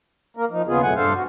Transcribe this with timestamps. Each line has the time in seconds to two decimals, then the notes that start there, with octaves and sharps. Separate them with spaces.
0.37 A#3 A#4
0.51 F3 D#4
0.67 D#2 C#3 B3 F4 G#4
0.82 F2 B2 F#3 A3 F#5 G#5
0.96 G2 D4 A4 C5 F5
1.14 F#4